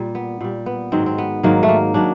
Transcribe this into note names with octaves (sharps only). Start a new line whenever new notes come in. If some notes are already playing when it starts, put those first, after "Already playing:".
Already playing: A#2 G3
B3
A#2 G3
B3
G#2 D#3 F#3 C4
C4
B3
G#2 D#3 F#3 A#3
A3
A#3
D#3 F#3 D4